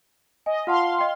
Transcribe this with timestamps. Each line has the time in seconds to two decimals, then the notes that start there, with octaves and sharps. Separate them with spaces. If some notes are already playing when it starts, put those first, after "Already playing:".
0.46 D#5 G#5
0.67 F4 F5 F#5 A5 C6
0.99 D#5 G5